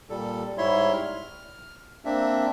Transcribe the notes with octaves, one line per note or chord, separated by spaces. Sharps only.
A#2 G3 A4
G#2 G3 E4 C#5 E5 C6
F6
A#3 C4 D4 E5